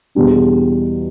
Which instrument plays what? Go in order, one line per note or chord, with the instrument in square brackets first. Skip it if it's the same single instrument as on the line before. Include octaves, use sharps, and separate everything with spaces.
[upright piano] E2 B2 G3 D4